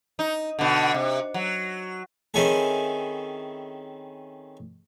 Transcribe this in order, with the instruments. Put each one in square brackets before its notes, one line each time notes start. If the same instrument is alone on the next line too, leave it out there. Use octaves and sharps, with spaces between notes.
[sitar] D#4
B2 D3
C3
F#3
[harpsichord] D#3 C4 C#4 E4 G#4 A4